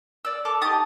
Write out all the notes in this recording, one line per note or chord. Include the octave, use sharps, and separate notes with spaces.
D5 E6
A4 F5 D6
D#4 G4 A5 D#6